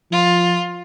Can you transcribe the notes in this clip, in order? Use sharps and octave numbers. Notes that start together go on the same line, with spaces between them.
F3 F4